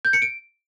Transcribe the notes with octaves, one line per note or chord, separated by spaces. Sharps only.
G6
C#7
D7